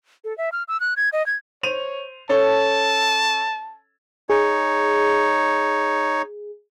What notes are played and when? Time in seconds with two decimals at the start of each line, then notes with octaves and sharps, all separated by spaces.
0.25 A4
0.38 E5
0.52 F6
0.68 E6
0.80 F#6
0.97 G#6
1.13 D#5
1.26 G#6
1.63 C5 C#5 D#7 F7
2.29 C#4 A4 C#5 A5
4.30 D#4 G#4 C#5